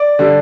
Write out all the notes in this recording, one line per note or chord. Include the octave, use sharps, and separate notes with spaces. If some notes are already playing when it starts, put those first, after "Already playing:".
Already playing: D5
D3 G3